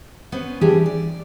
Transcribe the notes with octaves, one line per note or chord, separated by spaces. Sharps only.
B3 C#4 B4 C5
E3 G3 D4 G4 G#4
D5